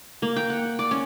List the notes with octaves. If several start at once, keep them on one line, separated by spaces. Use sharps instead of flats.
A#3
G5
F#5
D5
C#4